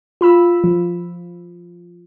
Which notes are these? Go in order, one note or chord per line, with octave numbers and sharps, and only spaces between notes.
F4 B5 E6
F3